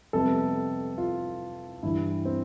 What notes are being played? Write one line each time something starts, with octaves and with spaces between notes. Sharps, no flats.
F2 C3 G3 B3 A4
F4
G2 E3 G3 E4
C4